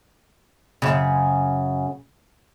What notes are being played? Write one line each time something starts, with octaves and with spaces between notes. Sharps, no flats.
F#2 C#3